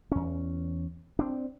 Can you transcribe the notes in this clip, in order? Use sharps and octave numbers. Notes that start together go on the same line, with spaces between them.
E2 C#4
C4 D4